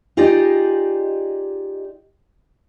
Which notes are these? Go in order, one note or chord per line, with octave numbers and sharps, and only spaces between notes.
D#4 F4 G4 G#4 D5 D#5